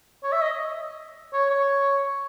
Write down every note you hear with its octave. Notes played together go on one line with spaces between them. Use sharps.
C#5
E5
D#5
C#5
C#5